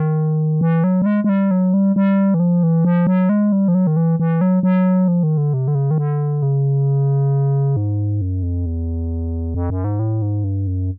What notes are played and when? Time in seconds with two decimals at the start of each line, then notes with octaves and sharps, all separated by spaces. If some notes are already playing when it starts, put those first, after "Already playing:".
Already playing: D#3
0.61 E3
0.84 F#3
1.02 G3
1.06 G#3
1.24 G#3
1.29 G3
1.51 F#3
1.74 G3
1.96 G3
2.34 E3
2.40 F3
2.63 E3
2.85 F3
3.07 F#3
3.29 G#3
3.52 G3
3.68 F3
3.75 F#3
3.87 D#3
3.96 E3
4.20 E3
4.41 F#3
4.63 F#3
5.08 F3
5.23 D#3
5.38 D3
5.54 C3
5.68 D3
5.75 C#3
5.91 D#3
5.98 D3
6.42 C#3
7.76 G#2
8.21 F#2
8.43 F2
8.66 E2
9.55 F2
9.70 F#2
9.84 G#2
9.99 A2
10.22 G#2
10.44 G2
10.67 F#2